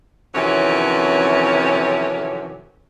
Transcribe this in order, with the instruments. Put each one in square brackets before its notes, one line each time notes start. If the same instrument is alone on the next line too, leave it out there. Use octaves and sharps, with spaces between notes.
[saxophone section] F2 C3 D#3 E3 F#3 C#4